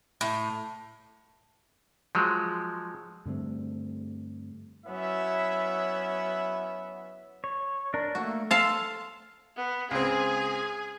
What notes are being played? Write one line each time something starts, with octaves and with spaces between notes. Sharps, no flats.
A2
F3 F#3 G#3
G2 D3 A3 C4
F#3 B3 C#4 E4 C#5 E5
C#5
D4 A#4
A3 A#3 F#4
A4 F5 A5 C6
B3
C#2 C4 G#4 G#5